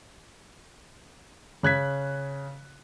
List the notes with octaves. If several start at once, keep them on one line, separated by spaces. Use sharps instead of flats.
C#3 F#6 G#6 B6